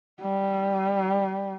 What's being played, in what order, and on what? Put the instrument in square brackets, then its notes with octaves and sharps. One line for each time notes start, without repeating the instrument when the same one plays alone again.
[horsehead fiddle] G3